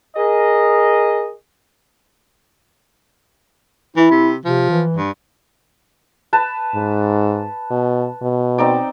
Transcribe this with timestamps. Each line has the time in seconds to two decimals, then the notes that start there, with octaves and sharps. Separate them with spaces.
0.16 G#4 A#4 D#5
3.97 E3 E4
4.11 C3
4.45 C3 F3
4.70 E3
4.97 G2
6.33 B4 A5
6.75 G#2
7.70 B2
8.22 B2
8.58 C4 D#4 D5